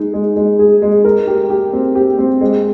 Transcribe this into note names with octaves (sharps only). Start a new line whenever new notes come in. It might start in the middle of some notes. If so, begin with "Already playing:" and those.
Already playing: G#3 D#4
G#3
G#3
G#4
G#3
A#4
G4
G4
C4
G4
C4
G#3